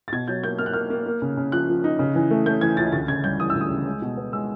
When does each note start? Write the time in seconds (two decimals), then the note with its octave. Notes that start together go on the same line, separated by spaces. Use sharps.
0.08 A6
0.12 B2 G#6
0.28 F#3 G6
0.43 A#3 G6
0.59 A#3 F6
0.66 F#6
0.73 A#3 F6
0.90 A#3
1.06 A#3
1.22 C#3
1.37 C#3
1.52 F3 F#6
1.68 F3
1.84 D#4
1.99 C#3
2.15 E3
2.31 A3
2.46 A3 G6
2.61 E3 G#6
2.77 C#2 A6
2.92 D2 A6
3.08 C#3 G#6
3.24 G3 G6
3.40 E3 D#6
3.50 E6
3.55 D2
3.61 D#6
3.71 C#3
3.86 G#3
4.02 B2
4.17 B3
4.33 G#3 E6